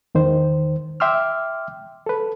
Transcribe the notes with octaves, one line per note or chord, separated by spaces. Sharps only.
E2 D#3 C5
E5 G5 C6 D6 E6 F6
A4 B4